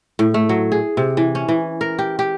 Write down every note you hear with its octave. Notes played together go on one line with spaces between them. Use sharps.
A2
A3
F#3
G#4
C3
E3
C#4
E3
A#4
G4
G4